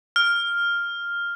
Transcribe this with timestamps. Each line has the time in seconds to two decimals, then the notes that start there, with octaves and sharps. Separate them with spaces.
0.16 F6